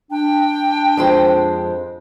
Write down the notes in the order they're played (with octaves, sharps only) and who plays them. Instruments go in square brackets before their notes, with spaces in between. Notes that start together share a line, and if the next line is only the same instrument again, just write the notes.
[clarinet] D4 [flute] G5
[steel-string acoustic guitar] F2 G#3 C5